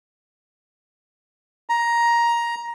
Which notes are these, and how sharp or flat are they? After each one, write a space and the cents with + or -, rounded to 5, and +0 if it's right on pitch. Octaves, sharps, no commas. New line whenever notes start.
A#5 +10